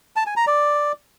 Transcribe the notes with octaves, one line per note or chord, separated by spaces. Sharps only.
A5
G#5
A#5
D5